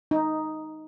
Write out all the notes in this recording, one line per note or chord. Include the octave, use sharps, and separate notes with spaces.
D#4